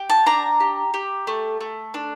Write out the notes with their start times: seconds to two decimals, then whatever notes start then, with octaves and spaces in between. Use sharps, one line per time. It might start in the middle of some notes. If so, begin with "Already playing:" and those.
Already playing: G4
0.10 A5
0.26 D4 A#5
0.60 G4
0.94 G4
1.27 A3
1.61 A3
1.94 D4